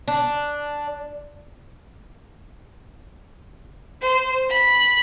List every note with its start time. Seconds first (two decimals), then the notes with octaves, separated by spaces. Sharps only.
0.08 D4
4.02 C5
4.49 B5